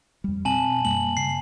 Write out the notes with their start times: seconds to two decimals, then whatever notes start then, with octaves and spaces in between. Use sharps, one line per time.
0.24 F2 G3
0.45 B2 C4 G#5 A5 F#7
0.85 F#2 G3 A#3 F#7
1.17 C#3 C7